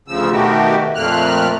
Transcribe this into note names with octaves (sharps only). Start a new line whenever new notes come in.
D2 C#3 F3 E6
B2 D#3 A3 F#4 G4
F2 A#2 A3 A#3 F6 F#6